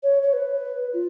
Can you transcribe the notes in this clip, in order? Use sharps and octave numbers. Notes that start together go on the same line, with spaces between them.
C#5
C#5
B4
F4